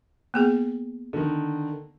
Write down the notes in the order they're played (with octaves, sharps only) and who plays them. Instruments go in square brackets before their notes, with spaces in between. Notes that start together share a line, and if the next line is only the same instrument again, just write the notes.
[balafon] A#3 B3 G#4
[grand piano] D3 D#3